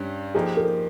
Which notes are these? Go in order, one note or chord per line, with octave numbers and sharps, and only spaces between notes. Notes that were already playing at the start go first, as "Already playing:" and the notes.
Already playing: G2 G3 C#4
F3 A#3 D#4 G4 G#4
A#4